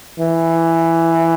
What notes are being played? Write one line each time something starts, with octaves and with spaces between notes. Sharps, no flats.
E3